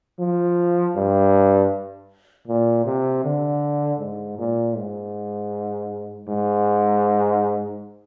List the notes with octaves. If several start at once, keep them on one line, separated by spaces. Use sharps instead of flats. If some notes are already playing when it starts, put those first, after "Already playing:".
F3
G2
A#2
C3
D3
G#2
A#2
G#2
G#2